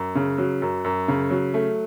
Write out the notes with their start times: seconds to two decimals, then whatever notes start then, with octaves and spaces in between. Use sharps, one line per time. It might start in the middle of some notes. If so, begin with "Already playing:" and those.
Already playing: F#2
0.15 C#3
0.38 F#3
0.62 F#2
0.85 F#2
1.08 C#3
1.30 F#3
1.54 A3